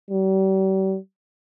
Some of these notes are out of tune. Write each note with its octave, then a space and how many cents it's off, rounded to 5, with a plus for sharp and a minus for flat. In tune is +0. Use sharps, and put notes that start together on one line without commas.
G3 -40